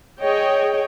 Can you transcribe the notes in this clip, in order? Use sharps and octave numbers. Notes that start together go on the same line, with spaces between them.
G#4 C#5 D#5 G5